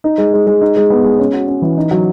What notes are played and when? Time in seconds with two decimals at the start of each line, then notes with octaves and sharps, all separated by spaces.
0.04 D#4
0.18 G#3
0.34 G#3
0.47 G#3
0.61 D#4
0.77 G#3
0.90 B3
1.04 G#3
1.19 C#4
1.33 F#4
1.48 C#4
1.62 E3
1.77 D#4
1.91 F#3